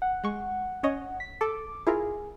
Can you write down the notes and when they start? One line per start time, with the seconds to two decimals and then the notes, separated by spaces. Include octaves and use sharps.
0.02 F#5
0.24 G#3 C#6
0.83 C#4 C#5 D#5
1.20 B6
1.41 A4 D6
1.87 E4 F4 G#4 A#4